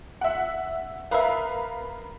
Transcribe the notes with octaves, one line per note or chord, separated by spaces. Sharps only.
E5 F#5
B3 A#4 B4 E5 F5